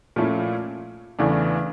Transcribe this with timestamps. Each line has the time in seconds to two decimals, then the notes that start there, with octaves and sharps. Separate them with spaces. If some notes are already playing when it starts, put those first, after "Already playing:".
0.16 A#2 F3 A3 C#4 E4
1.19 E2 C#3 E3 A3 D4